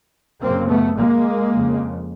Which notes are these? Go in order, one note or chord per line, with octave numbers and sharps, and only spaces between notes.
F#2 C#3 A#3 C4
A3 B3
G#3 A#3
F2 C#3